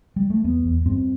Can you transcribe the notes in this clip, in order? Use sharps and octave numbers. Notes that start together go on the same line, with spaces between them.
G3
A3
E2 B3
E2
G2 C4